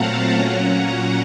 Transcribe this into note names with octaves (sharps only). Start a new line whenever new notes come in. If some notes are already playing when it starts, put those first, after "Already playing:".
Already playing: A#2 F#3 A3 C4 F5 F#5 A5 A#5
A#2 F#3 A#3 C#4